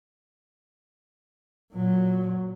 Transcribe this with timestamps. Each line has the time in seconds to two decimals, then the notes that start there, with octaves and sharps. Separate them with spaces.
1.72 A#2 F#3